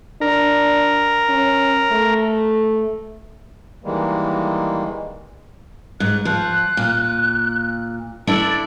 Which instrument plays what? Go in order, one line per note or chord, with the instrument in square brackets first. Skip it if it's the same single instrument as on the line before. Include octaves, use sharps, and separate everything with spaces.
[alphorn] D4 [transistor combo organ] A#4
[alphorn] C#4
A3
[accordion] D#3 E3 G3 G#3 A#3
[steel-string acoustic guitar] G#2 [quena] F#6
[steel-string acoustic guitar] F3 [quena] F#6
[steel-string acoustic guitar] A#2
[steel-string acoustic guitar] D4 E4 D5 [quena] A4